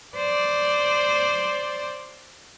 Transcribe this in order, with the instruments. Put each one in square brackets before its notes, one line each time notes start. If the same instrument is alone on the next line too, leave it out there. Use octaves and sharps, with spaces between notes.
[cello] C5 D5